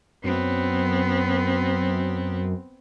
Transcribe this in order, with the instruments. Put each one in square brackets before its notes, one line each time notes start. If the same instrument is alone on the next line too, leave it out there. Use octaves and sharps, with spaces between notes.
[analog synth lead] F#2 [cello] B3 C4